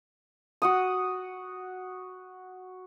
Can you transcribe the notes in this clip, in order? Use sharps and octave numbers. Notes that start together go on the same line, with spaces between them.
F#4 F#5 D#6